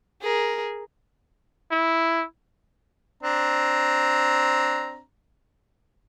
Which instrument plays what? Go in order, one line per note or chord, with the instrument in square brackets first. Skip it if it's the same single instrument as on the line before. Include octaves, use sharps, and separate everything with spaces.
[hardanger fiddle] G#4 A#4
[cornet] E4
[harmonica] C4 D4 A#5